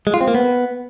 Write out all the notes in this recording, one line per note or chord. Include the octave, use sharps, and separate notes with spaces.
G#3
F4
C4
A#3
B3